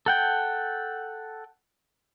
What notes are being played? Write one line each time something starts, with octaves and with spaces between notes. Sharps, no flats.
A4 F#5 G5